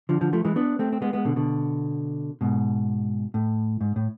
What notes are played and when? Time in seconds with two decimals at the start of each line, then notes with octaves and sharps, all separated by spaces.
0.09 D3 F3
0.21 D3 F3
0.33 F3 A3
0.45 E3 G#3
0.56 B3 D4
0.79 A3 C4
0.93 C4
1.02 G#3 B3
1.13 G#3 B3
1.25 B2 D3
1.36 B2 D3
2.41 G#2 B2
3.34 A2
3.81 G#2
3.96 A2